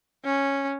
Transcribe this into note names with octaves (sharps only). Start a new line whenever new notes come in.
C#4